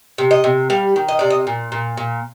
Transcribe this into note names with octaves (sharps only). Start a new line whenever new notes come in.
C3
D#5
C3
G3 F5
D#3
D#5
C3 D5
D#5
A#2
A#2
A#2